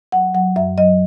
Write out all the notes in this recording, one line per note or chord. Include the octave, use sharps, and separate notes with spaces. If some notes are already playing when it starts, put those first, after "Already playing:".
F#3 F#5
F#3 F#5
F#2 E5
F#3 D#5